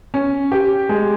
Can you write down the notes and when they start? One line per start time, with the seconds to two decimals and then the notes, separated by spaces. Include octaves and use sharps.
0.14 C#4
0.52 G4
0.89 G#3